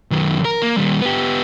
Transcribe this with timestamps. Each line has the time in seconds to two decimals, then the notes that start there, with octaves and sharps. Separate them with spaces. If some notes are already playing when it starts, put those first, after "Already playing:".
0.11 F#2 D#3
0.45 A#4
0.62 A#3
0.77 D#2 G3
1.01 B3 G4